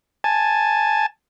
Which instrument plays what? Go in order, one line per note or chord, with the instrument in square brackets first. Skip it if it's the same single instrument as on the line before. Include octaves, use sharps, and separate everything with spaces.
[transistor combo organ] G#5 A5